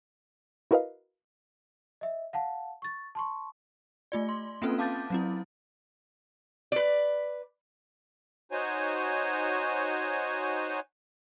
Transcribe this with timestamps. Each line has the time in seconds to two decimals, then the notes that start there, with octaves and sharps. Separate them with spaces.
0.71 E4 F#4 A#4 B4 D#5 F5
2.01 D#5 E5
2.33 F5 F#5 A5
2.82 C#6 A6
3.15 A5 C6 C#6
4.12 A3 F4 D5
4.29 C6
4.62 A#3 C4 C#4 F4 A4 B4
4.78 F5 A5 D6 G6 A6
5.10 F#3 C4 E4
6.72 B4 D5
8.52 D#4 F#4 C5 C#5 G#5